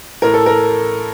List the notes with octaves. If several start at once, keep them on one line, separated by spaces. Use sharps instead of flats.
A2 A#4
A4
A#4